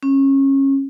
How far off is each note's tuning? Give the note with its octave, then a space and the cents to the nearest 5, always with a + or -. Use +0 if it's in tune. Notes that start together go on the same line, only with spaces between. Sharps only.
C#4 -25